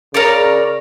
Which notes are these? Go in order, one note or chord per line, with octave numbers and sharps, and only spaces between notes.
C#3 A#4 C#5 D5